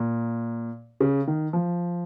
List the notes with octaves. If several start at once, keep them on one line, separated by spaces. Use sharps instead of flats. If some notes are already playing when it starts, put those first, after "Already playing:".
Already playing: A#2
C#3
D#3
F3